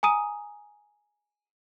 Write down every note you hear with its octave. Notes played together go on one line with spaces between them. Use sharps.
G#5 A#5 D#6 D#7